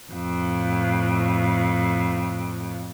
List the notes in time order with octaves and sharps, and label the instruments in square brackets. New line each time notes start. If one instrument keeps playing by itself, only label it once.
[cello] F2 A2